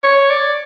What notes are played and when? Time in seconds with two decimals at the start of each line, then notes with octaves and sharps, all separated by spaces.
0.03 C#5
0.30 D5